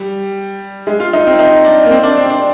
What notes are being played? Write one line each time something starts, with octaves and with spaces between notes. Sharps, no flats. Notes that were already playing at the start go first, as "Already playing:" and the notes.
Already playing: G3
G#3
F4
D#4
C4
D#4
D4
A#3
C4
D4
C4
D4